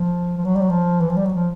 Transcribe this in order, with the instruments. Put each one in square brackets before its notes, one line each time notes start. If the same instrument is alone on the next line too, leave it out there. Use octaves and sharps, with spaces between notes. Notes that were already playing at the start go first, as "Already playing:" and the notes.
Already playing: [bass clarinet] F3
F3
F#3
G3
F#3
F3
E3
F3
G3
F#3
F3